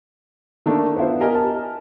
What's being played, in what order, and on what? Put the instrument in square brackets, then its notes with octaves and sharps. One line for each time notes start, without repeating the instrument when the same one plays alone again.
[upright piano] D#3 A3 A#3 D4
B3 D4 E4 F4 C5
G4 A#4 D#5 G#5 F6
A5